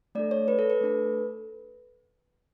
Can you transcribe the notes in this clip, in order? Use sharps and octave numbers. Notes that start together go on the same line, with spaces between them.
A3 D4 A4 D5
C#5
B4
A4
B4
A3 D4 A4